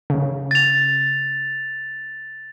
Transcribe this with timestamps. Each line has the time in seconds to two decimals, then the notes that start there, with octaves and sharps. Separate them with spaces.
0.10 C#3
0.51 A6 F7